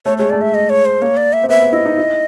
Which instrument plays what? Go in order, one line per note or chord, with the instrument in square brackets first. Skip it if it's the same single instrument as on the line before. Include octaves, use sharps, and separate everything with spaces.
[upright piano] A3 [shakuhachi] C#5
[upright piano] G#3 [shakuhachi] C#5
[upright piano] A3 [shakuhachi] D5
[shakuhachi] E5
D#5
C#5
C5
[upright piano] A#3 [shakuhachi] C#5
[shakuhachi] D5
E5
[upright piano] C4
[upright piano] B3 [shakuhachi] E5
[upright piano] B3
[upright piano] E4 [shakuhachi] D#5
[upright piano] D#4
E4